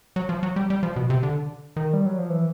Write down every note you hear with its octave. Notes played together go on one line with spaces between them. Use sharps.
F#3
F3
F#3
G3
G3
F3
B2
C3
D3
D#3
G3
F#3
F3
E3